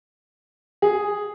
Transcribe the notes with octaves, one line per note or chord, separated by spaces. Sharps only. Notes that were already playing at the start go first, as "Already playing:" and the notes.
G#4